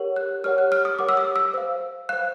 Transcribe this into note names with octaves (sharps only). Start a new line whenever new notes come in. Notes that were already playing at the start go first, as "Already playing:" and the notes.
Already playing: G4 A#4 C#5 F#5
F#6
G4 A#4 C#5 F#5 F6
F#6
F6
D#6
G4 A#4 C#5 F#5 D6
E6
D#6
E6
C5 F5
C5 F5 F#6